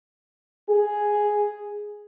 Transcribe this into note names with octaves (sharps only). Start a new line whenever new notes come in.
G#4